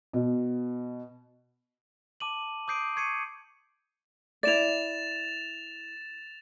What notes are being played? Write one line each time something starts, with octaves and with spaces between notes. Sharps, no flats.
B2
A5 D6 D#7 F#7
D6 D#6 G6 C7 D7 D#7
C#6 G#6 C7 C#7 D#7
E4 D5 A6 E7 F7